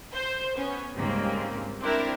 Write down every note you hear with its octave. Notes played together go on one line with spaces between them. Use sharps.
C5
B3 C#4
C#2 G#2 C#3 G3 A#3 C4
C4 D4 E4 A#4